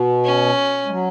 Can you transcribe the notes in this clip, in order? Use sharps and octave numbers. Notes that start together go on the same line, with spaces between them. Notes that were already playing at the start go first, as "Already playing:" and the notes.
Already playing: B2
C#4
G#3
F#3